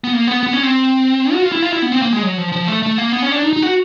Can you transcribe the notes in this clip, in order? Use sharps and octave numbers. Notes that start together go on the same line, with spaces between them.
B3
A#3
B3
B3
C#4
C4
F#4
F4
E4
F4
E4
B3
C4
A#3
G#3
F#3
F3
F3
A3
A3
A#3
B3
C#4
D4
D#4
D#4
F#4